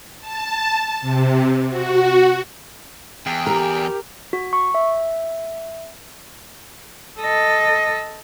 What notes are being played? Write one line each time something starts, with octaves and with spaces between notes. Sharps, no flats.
A5
C3
F#4
E2 G5
G4 A#4
F#4
C#6
E5
A4 D#5